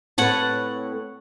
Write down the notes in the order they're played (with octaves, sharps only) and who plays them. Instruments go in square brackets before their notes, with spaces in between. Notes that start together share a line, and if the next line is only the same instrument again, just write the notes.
[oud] A2 B4 [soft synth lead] C4 [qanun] C#5 F#5 A5